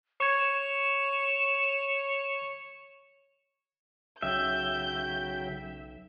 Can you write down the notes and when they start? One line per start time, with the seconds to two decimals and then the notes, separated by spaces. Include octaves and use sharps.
0.20 C#5 C#6 G#6 E7
4.22 B1 C#3 F#3 E5 G5 G6